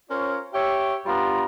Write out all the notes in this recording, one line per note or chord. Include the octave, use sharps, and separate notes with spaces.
C#4 F4 A#4 C5 C#5
G4 C#5 E5
G2 G3 B3 F4 A#5 C6